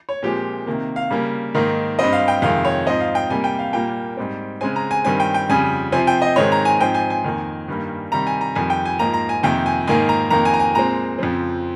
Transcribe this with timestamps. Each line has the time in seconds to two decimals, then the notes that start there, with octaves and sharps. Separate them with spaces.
0.09 C#5
0.23 A#2 F3 G#3 C4 G4
0.67 C3 D#3 A#3
0.96 F5
1.10 C#3 G3 A#3
1.55 G#2 D#3 A#3
1.99 G2 G3 C4 D#5
2.13 F5
2.28 G5
2.42 F2 C3 D#3 G#3 F5
2.65 C#5
2.87 G#2 F3 C4 D#5
3.01 F5
3.15 G5
3.30 C3 G3 A#3 G#5
3.44 G5
3.59 F5
3.73 A#2 G3 A#3 G5
4.17 G#2 G3 C4
4.61 C#3 G#3 C4 G#5
4.76 A#5
4.91 G#5
5.05 G2 D#3 G3 C4 G#5
5.20 G5
5.34 G5
5.50 F2 C#3 G3 G#5
5.92 C3 F3 C4 G#5
6.07 G5
6.22 D#5
6.36 G#2 D#3 G#3 C4 C#5
6.52 A#5
6.65 G#5
6.81 G#2 F3 C4 G5
6.95 G#5
7.10 G#5
7.24 F2 D#3 A#3
7.68 G2 D#3 G3 A#3
8.12 C3 D#3 G3 A#5
8.27 G#5
8.41 A#5
8.55 F2 D#3 G3 G#5
8.70 G5
8.85 G#5
8.99 G#2 F3 A#3 A#5
9.14 A#5
9.29 G#5
9.43 F2 C3 D#3 A#3 G5
9.66 G#5
9.87 G#2 D#3 A#3 G#5
10.09 A#5
10.30 F2 D#3 A#3 A#5
10.45 G#5
10.53 A#5
10.60 G#5
10.75 A#2 G#3 C4 A#5
11.19 F2 C#3 F3 C4